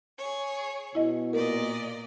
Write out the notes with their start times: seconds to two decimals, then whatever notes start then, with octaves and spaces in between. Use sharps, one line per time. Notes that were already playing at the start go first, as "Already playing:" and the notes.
0.18 G#4 C#5
0.95 B2 E4 D#5
1.33 A#2 A#4 D5 D#5